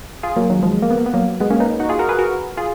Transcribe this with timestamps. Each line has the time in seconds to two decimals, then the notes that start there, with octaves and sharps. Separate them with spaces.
0.23 F4 G#4
0.36 F#3 A#3
0.50 D#3 F#3
0.63 F3 G#3
0.82 A#3
0.90 B3
0.98 A#3
1.06 B3
1.14 F#3 A#3
1.40 G#3 B3
1.50 A#3 C#4
1.60 B3 D#4
1.80 D#4 F#4
1.89 F4 G#4
1.99 F#4 A#4
2.09 G#4 B4
2.19 F#4 A#4
2.57 F4 G#4